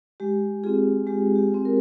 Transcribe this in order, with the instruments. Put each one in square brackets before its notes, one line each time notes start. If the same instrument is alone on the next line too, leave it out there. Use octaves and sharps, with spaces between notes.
[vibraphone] G#3 G4
C4 F4 G#4
G#3 G4
G4
C4 F4
A#4